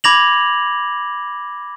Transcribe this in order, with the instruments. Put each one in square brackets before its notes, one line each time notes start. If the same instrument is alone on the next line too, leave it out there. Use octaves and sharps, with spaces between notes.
[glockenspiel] B5 D6 G#6 A#6 F7 F#7